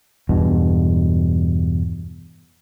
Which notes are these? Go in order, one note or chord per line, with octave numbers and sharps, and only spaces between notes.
E2 G2 B2